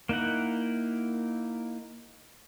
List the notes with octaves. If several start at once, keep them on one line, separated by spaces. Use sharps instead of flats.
A#3 D#4 E4 F#5